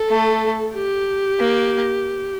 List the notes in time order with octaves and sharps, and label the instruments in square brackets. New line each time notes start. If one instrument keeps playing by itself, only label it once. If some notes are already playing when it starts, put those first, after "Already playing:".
Already playing: [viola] A4
[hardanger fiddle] A3
[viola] G4
[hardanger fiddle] A#3